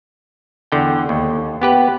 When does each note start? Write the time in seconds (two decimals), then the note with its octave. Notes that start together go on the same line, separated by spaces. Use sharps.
0.72 E2 D3 G5
1.09 D#2
1.62 B3 G4 B4